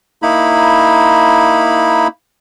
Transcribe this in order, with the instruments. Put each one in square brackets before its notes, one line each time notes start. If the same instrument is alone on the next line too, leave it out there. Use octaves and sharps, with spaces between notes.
[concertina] A#3 D#4 E4 B5